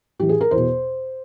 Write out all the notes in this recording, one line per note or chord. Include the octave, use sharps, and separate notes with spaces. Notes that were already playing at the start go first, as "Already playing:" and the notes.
A2 E3 G4
G#4
A#4
E2 B2 C5